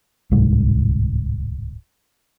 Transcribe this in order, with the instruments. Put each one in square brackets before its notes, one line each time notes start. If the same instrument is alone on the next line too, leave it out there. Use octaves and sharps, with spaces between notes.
[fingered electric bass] D1 C2 G#2